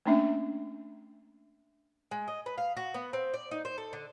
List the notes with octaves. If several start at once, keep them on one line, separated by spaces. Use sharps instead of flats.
A3 A#3 C#4 D4 E5
G#3
D#5
B4
F5
F#4
B3
C4
D5
D#4
C5
A4
D3